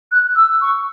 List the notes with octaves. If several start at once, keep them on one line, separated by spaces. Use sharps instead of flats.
F#6
E6
C#6